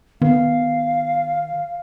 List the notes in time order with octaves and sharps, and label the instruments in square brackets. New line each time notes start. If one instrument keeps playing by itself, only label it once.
[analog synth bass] D#3 [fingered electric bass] B3 [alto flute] F5